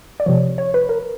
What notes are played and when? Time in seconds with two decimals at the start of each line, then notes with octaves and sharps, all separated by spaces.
0.20 D5
0.26 C3 F3 C#5
0.58 C#5
0.74 B4
0.89 A#4